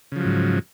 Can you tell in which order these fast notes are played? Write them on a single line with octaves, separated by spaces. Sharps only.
C#3 F3 F#3 G#2